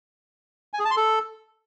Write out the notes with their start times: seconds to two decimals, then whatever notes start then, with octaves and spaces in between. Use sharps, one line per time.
0.73 G#5
0.79 G#4
0.85 A5
0.91 C6
0.97 A4